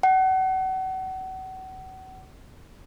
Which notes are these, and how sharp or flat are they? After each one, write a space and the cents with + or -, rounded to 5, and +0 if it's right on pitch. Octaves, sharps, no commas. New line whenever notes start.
F#5 +35